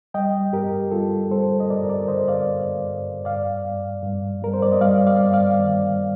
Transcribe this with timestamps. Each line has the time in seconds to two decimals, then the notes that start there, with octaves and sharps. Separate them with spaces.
0.14 G3 D#5 G5
0.53 G2 G4 A#4
0.91 G3 F4 A4
1.31 G3 A4 C5
1.60 D#5
1.70 G2 A#4 D5
1.89 A#4 D5
2.08 D3 C5 D#5
2.28 D5 F5
2.47 G2
2.86 G2
3.25 G2 D5 F5
3.65 G2
4.03 G2
4.42 G3 A#4
4.54 C5
4.62 D5
4.72 D#5
4.81 G3 D5 F5
5.07 D5 F5
5.21 G2
5.33 D5 F5
5.60 D#3